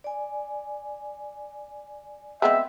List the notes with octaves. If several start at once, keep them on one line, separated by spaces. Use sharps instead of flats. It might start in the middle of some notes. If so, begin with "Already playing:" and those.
D5 G#5
G#3 B3 C4 E5